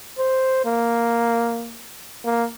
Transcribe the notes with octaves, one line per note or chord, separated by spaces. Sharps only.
C5
A#3
A#3